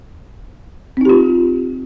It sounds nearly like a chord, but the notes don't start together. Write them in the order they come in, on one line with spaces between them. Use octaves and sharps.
C4 D#4 G4 F4